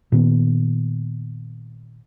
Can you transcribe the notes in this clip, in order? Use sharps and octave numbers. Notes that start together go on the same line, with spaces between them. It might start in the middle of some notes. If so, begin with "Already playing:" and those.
A#2 D#3 B3